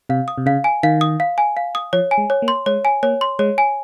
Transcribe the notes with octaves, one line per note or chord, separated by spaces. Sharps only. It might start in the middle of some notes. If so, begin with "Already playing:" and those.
C3 F5
D#6
C3
C#3 F5
G#5
D#3 F5
D#6
F5
G#5
F5
D#6
F3 C#5
G#5
G#3
C#5
A#3
C6
G#3 C#5
G#5
A#3 C#5
C6
G#3 C#5
G#5